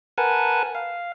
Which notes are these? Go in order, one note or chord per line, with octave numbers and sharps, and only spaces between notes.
A#4 B4 F#5 G#5 A5
F5